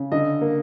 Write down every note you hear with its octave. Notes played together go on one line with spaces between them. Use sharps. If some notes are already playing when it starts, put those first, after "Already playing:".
Already playing: C#3
D3 D#5
A#3